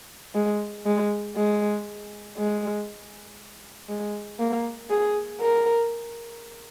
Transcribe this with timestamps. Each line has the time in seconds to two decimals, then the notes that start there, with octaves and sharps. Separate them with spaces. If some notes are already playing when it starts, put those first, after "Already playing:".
0.35 G#3
0.86 G#3
1.36 G#3
2.38 G#3
3.89 G#3
4.40 A#3
4.90 G#4
5.40 A#4